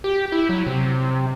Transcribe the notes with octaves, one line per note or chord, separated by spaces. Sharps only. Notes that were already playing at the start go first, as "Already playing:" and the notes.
G4
E4
F#3
C3